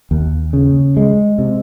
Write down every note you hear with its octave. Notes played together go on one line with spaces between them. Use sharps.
D#2
C#3
G#3
C3